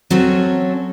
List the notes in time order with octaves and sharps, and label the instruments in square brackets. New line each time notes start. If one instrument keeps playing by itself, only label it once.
[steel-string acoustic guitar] F#3 C4 C#4 A4 C#5